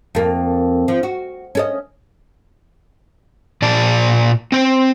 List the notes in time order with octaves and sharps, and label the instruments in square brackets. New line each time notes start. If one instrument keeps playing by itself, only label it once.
[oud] F2 A#3
F3
F#4
C#4 A4 D#5
[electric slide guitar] A#2 D5 A5
C4 C5